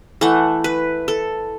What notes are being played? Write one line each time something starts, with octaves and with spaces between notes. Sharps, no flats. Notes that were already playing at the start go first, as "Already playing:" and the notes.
E3 A3 F#5
B4
A4